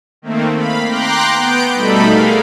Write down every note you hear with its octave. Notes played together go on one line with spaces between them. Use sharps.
D#3 A3 A#3 C4
F5 B5
G5 A#5 C6 D6 F#6
B3 G6 D7
B2 G3 A3 D#4 A4 B5
G#4 A#4 F5